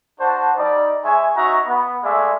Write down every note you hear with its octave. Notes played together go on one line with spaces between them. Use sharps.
D4 F#4 C5 F#5 A5
G3 D#4 D5
G#3 C#5 E5 G#5
C#4 D#4 F#4 E5 A#5 C#6
B3
G#3 A3 D5 E5 F5 G#5